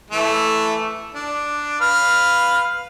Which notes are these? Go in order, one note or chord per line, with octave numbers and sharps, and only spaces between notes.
E3 A3
D4
B4 F5 F6